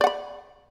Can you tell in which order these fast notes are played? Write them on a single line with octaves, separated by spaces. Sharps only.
D5 F#5 B5